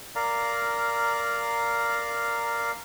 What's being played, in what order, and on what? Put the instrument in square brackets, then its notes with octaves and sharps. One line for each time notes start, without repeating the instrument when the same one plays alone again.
[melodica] A#4 D5 F5 A#5